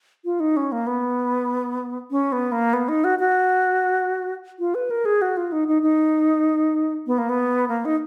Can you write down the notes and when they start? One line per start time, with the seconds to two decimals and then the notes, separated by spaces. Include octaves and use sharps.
0.25 F4
0.40 D#4
0.57 C#4
0.72 A#3
0.87 B3
2.11 C#4
2.32 B3
2.52 A#3
2.73 B3
2.89 D#4
3.04 F#4
3.19 F#4
4.59 F4
4.75 B4
4.91 A#4
5.05 G#4
5.22 F#4
5.37 F4
5.52 D#4
5.68 D#4
5.82 D#4
7.07 B3
7.18 A#3
7.29 B3
7.68 A#3
7.85 D#4